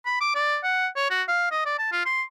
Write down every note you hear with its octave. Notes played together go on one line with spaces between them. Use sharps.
B5
D6
D5
F#5
C#5
F#4
F5
D#5
D5
A5
F4
C6